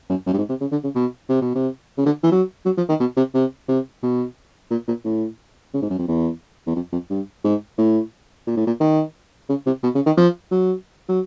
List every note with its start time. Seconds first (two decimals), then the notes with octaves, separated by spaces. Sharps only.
0.09 F#2
0.27 F#2
0.33 G2
0.38 G#2
0.49 C3
0.61 C#3
0.72 D3
0.83 C#3
0.95 B2
1.29 C3
1.41 B2
1.55 C3
1.98 C#3
2.06 D3
2.23 E3
2.31 F#3
2.65 F#3
2.77 F3
2.89 D#3
3.00 B2
3.17 C3
3.34 C3
3.68 C3
4.03 B2
4.71 A#2
4.88 A#2
5.05 A2
5.73 C#3
5.82 G#2
5.90 F#2
5.98 F2
6.08 E2
6.67 E2
6.75 F2
6.92 F2
7.10 G2
7.44 G#2
7.78 A2
8.47 A#2
8.57 A2
8.67 A#2
8.80 D#3
9.49 C#3
9.66 C3
9.83 B2
9.95 C#3
10.06 D#3
10.17 F3
10.51 F#3
11.09 F#3